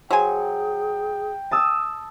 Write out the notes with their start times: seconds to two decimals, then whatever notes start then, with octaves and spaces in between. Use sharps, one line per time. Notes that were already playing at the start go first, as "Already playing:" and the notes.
0.11 F#3 G#4 C5 G5 G#5
1.51 A5 D#6 E6